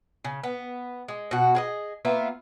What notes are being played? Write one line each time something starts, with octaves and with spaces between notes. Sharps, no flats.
C#3
B3
G#3
B2 F#4
G#4 A#4 D#5
A#3 B3 F4 E5